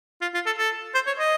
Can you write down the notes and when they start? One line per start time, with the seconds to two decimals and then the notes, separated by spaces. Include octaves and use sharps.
0.22 F4
0.34 F4
0.46 A4
0.58 A4
0.95 C5
1.07 C#5
1.19 D#5